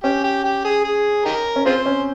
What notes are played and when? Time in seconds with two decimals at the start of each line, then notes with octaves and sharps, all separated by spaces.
0.04 C#4 G4
0.24 G4
0.44 G4
0.65 G#4
0.85 G#4
1.25 D#4 G4 A#4
1.56 C#4
1.66 C4 F4 G#4 C5
1.86 C#4